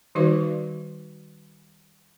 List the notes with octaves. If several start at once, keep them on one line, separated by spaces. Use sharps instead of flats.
D#3 G3 D#4 F#4 B4 D5